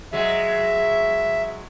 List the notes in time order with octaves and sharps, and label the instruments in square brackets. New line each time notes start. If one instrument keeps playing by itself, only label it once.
[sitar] F#3 G#3 [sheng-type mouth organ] E5